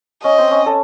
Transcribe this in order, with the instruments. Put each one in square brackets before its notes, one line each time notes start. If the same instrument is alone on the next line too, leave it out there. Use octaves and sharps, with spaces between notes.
[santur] C#4 [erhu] D#5
[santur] C4
C#4
A4